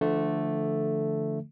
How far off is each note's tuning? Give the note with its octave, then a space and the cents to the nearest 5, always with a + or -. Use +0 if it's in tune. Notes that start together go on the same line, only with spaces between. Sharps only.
D3 +0 F3 -30 A3 +0